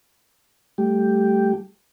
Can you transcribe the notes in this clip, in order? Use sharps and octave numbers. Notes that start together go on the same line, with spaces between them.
G3 A3 G4